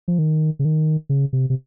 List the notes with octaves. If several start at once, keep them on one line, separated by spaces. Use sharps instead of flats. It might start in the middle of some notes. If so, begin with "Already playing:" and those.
F3
D#3
C#3
D#3
C#3
C3
C3